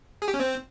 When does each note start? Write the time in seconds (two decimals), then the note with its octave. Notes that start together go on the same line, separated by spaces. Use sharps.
0.22 G#4
0.28 G4
0.34 C#4
0.40 C4